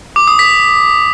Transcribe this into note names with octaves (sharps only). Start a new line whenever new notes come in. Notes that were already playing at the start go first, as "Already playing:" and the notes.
D6
D#6
B6